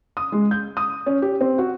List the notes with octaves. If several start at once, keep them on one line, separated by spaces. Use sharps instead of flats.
D#6
G#3
G6
D#6
C#4
G4
C4
F#4